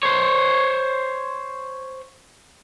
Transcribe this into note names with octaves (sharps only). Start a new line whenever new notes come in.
C5 C#5